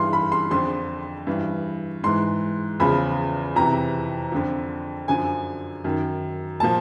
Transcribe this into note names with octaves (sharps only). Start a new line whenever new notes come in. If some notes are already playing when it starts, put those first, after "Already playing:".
Already playing: G2 E3 C6
B5
C6
F2 D3 F3 C6
G2 E3
G#2 E3 C6
E2 C#3 F3 B5
F2 C3 E3 A#5
F2 D3 F3
F#2 D3 F3 G#5
F#2 D#3
A#2 F3 A5